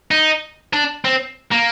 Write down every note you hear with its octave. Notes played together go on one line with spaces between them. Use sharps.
D#4
D4
C4
A#3